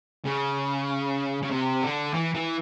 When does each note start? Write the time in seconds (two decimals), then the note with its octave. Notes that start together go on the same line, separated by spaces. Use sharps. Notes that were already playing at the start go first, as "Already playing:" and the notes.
0.25 C#3
1.42 C#3
1.51 C3
1.82 D3
2.13 E3
2.34 E3